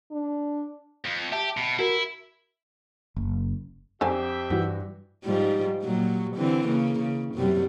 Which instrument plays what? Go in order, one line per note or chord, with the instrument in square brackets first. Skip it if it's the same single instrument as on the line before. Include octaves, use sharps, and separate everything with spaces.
[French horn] D4
[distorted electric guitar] F2
[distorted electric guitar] G4 [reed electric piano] E5 A5
[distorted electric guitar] B2
[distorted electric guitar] E4 [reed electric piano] F#4 A#4
[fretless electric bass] F#1
[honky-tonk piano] F2 [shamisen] D3 A4 G#5 [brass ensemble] G4 E5 G5
[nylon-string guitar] G2 [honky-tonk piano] E3 F#4
[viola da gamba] G#2 F3 G3
A#2 F#3 G3
D3 E3 C4
C#3 A#3
C#3
F#2 C3 G3